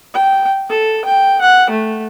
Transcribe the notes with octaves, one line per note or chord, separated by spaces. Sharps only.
G5
A4
G5
F#5
A3